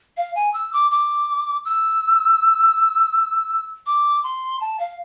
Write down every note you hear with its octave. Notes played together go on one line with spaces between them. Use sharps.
F5
G#5
E6
D6
D6
E6
D6
C6
A5
F5